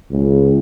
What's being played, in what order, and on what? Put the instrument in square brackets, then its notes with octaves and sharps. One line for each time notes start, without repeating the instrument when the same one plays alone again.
[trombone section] C#2